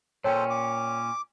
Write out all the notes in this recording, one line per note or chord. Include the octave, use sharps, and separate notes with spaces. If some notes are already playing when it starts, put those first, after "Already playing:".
A#2 C#4 A4 C5 C#5 G5
D6